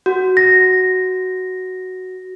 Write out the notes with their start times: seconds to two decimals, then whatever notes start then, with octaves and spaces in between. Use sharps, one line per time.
0.06 F#4
0.37 A#6